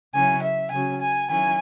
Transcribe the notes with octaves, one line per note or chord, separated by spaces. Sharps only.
C#3 F#3 C#4 E4 G#5
E5
C#3 F#3 C#4 G#5
G#5
D#3 F#3 C#4 E4 G#5